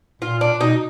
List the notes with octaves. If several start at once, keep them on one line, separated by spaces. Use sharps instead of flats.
A#2 F4
D4
B2 D#4